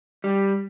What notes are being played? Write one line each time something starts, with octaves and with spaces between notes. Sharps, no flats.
G3